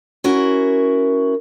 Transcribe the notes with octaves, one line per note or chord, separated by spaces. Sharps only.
C#4 E4 F#4 A#4